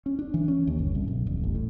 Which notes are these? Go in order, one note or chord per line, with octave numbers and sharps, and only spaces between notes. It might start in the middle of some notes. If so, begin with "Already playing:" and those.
C#4
D4
E3
C#4
D#2
G1
C2
B1
D#1
A1
A2